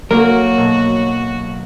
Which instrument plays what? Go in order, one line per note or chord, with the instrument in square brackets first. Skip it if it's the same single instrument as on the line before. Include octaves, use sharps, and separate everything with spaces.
[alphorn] F#3 [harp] A#3 [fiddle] F#4 [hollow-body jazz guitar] A#4
[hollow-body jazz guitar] B1